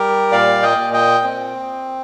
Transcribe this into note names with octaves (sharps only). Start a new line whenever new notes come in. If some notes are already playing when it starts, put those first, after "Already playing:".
Already playing: G3 G4 A#4
A#2 D5 F5
D#5 G5
A#2
D#5 G5
C4